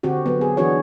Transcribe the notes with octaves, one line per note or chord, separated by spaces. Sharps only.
D3 C4 F#4 G4
F#3 B3
G#4
E3 D4 F#4 G#4 C#5